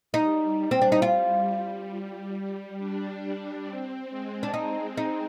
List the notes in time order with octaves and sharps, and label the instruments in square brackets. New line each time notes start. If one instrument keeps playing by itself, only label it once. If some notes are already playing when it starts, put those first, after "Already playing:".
[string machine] G3 [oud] D#4
[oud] C4
D4
D#4
F4
[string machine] D4
C4
G#3
[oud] D4
[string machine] G#3 [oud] D#4
[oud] D#4